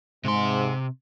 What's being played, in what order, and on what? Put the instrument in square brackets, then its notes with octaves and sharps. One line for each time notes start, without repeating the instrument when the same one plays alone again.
[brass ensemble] G#2 [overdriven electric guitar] C3 C6